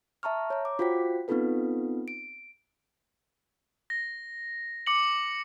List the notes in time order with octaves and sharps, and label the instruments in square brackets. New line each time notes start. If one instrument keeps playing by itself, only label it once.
[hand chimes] E5 A5 A#5 C#6 F6
C#5 A#5
D6
F4 F#4 C5 G5 B6
B3 C4 D#4 F4 A4 B4
D7
[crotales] A#6
D6 C#7 F#7